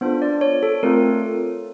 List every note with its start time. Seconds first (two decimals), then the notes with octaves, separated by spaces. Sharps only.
0.01 B3 D4 F4 A4 C5
0.22 D5
0.41 C#5
0.63 A4
0.83 A3 C4 F4 A4 A#4